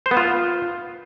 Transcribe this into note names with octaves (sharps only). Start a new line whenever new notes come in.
C5
B3
F4